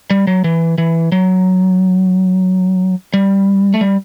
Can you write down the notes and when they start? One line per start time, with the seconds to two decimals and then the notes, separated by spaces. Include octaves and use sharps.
0.10 G3
0.27 F#3
0.44 E3
0.78 E3
1.12 F#3
3.14 G3
3.74 A3
3.81 G3